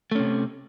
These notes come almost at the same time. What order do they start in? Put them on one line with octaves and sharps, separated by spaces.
A3 C#4 C3